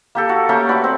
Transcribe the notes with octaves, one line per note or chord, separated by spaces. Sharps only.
A#3 G4 A4
F#4
A3 A#3 C#4 G4
F#4 B4 D5
C4